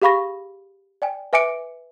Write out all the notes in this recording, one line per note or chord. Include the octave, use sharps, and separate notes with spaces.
G4 G#4 F5 B5 C#6 A#6
D5 G5 G#5
B4 E5 G#5 D6 C#7 D7